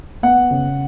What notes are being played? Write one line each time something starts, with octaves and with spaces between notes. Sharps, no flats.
B3 F#5
C#3